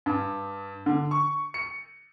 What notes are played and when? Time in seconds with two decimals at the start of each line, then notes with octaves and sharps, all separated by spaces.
0.06 G2
0.86 D3
1.11 C#6
1.54 C#7